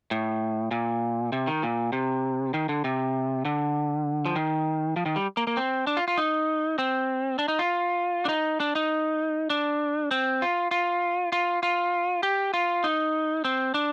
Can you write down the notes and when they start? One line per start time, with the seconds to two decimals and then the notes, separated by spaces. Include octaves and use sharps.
0.11 A2
0.71 A#2
1.32 C3
1.47 D#3
1.63 A#2
1.93 C3
2.54 D#3
2.69 D3
2.84 C3
3.45 D3
4.26 F3
4.36 D#3
4.96 F3
5.06 D#3
5.16 G3
5.37 A#3
5.47 A#3
5.57 C4
5.87 D4
5.97 F4
6.08 F4
6.18 D#4
6.78 C4
7.39 D4
7.48 D#4
7.59 F4
8.25 D4
8.29 D#4
8.60 D4
8.75 D#4
9.50 D4
10.11 C4
10.42 F4
10.71 F4
11.32 F4
11.63 F4
12.23 G4
12.54 F4
12.84 D#4
13.45 C4
13.74 D4